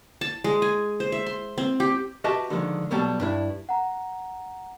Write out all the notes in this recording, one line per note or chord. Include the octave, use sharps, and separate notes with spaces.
A5
G#3
G#5
C5
E5
C6
C4
G4
F#4 G4 B4 D#5 E5 A5
D3 D#3 F3 G#3
B1 B2 F#3 G3 G4 A4
G2 D4 E4
F#5 A#5